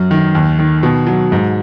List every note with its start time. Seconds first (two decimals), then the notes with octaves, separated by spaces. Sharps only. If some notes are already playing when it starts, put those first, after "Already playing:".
Already playing: F#2 F#3
0.11 D#3
0.35 D#2
0.59 D#3
0.83 B2
1.07 F#3
1.32 G#2